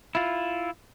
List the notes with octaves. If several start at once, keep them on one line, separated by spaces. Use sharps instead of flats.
E4 F4